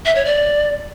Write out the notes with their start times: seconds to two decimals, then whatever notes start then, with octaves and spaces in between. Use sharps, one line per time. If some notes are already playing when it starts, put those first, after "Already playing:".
0.05 E5
0.15 C#5
0.25 D5